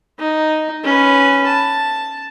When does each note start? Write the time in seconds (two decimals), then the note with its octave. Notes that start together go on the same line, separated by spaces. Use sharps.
0.19 D#4
0.84 C#4 B4
1.47 A5